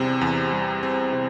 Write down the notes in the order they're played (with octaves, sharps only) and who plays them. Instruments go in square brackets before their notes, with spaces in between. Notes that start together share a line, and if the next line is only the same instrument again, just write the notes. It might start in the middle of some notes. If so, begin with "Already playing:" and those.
Already playing: [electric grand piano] E2 C3 G3 C4
E2
G3
C4
C3